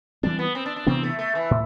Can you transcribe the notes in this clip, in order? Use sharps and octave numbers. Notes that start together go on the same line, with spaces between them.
E3 G3 C4 D4
B3
C4
D4
D4
C3 E3 B3 C4 D4
A3
A3
E3
A2